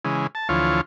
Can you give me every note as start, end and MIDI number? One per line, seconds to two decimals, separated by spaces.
0.05 0.27 49
0.05 0.27 52
0.05 0.27 56
0.35 0.48 81
0.49 0.81 38
0.49 0.81 52
0.49 0.81 53
0.49 0.81 65
0.49 0.81 73